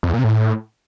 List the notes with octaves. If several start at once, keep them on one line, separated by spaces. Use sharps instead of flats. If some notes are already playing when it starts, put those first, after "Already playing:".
F2
E2
A#2
C3
A2